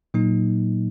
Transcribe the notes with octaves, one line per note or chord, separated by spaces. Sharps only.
A#2 F#3 A#3 D#4